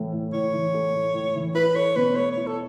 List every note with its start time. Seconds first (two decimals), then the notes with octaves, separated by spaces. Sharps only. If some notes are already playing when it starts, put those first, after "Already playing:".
Already playing: A2 E3 A3
0.12 A2
0.33 A2 C#5
0.53 E3
0.74 A3
0.94 A2
1.14 A2
1.35 E3
1.55 E4 B4
1.76 A4 C#5
1.96 B2 B4
2.16 A3 C#5
2.32 C#5
2.37 E4
2.47 A4